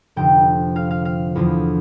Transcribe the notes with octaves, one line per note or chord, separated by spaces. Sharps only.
F1 F2 D3 G5
F5
F5
F5
E2 D3 F3